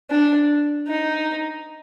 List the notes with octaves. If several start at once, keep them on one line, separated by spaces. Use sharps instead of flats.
D4
D#4